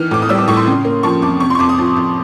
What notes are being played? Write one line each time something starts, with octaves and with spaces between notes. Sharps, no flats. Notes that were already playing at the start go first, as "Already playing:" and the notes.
Already playing: D#3 E3 F6
A2 D6
D#6
G3 E6
D6
A2 C#6
C6
C#3
A#3
F3 C#6
F2 D6
C3 C#6
C6 C#6
F2 D6
D#6
F3
F2